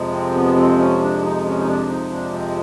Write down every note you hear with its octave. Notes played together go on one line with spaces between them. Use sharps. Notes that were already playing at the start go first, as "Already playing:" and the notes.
Already playing: F2 C3 F3 G#3
C4
B3
C4
C#4
D4
D#4
C#4
D#4
D4
D#4
D4
C4